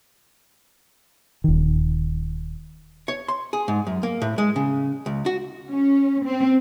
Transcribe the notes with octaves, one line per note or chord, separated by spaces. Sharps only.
D#1 D#3
C#5
C6
G#4
G#2
F#2
A#3
A2
G#3
C#3
C#2
F#4
C#4
C4